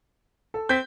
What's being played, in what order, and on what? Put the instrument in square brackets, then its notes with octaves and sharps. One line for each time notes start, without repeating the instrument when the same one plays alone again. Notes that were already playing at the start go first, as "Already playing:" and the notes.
[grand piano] A4
[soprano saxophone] C4 [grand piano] G6 B6